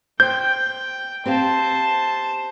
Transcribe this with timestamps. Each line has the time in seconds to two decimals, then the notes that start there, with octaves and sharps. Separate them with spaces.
0.20 C5 G5 G6
1.26 C4 G4 C5 F5 A5